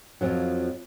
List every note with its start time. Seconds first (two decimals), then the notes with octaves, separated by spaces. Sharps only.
0.21 F2 F3 F#3